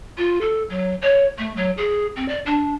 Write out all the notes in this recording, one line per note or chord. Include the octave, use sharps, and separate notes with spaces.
F4
A4
F#3
C#5
A3
F#3
G#4
C4
D5
D4